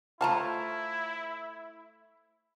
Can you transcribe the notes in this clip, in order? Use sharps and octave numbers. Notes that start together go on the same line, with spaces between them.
A3 E4 F4 C5 F5 A5 A#5